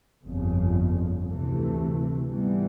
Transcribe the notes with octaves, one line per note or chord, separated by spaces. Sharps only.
G1 F2 C#3
D2 C3 E3 A3
G#2 E3 G3 B3